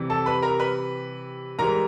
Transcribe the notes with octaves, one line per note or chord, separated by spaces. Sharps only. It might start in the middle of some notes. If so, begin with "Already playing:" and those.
Already playing: C3 E3 G3
A4 A5
B4 B5
A#4 A#5
B4 B5
G#2 E3 G3 A#4 A#5